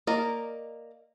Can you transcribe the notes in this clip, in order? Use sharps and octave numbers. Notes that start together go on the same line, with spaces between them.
A#3 A#4 D5 D#5